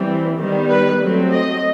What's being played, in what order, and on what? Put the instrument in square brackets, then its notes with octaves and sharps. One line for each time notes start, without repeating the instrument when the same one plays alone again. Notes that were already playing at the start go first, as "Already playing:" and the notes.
Already playing: [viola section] E3 G3 C4
D#3 G3 B3
B4
F#3 A3 C4
D#5